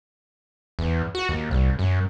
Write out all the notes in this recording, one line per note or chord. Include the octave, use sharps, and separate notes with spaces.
E2
F#4
D#2
C2
F#2